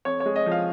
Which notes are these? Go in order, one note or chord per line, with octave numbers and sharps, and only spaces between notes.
F2 C#5
C#5
G#3
D#5
F3
F5